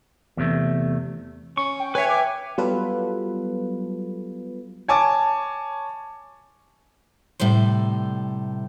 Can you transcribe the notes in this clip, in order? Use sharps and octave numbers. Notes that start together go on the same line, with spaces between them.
E2 C3 A3
C#4 C#6
G5
B4 C#5 E5 G#5
D6
F#3 G3 B3 F4 A4 B4
C#5 G#5 A5 D6
A2 C3 G3 C5